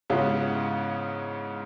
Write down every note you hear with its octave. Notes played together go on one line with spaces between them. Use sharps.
G#2 C#3 B3 C#4 E4 F4